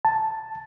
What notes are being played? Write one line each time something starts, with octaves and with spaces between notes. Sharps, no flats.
A5